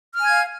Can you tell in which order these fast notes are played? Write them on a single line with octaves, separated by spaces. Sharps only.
F6 G#5 G#6 F5